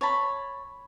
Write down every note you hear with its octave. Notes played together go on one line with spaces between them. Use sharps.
C#5 A5 B5